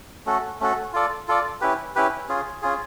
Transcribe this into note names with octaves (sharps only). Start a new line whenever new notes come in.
A3 C#4 F#4 A4
A3 C#4 F#4 A4
F4 A4 D5
F4 A4 D5
C#4 E4 G4 B4
C#4 E4 G4 B4
C#4 F4 G#4
C#4 F4 G#4